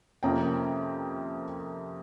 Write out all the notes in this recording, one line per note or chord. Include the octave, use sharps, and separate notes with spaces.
F2 C3 F3 A#3 C#4 G5 A#5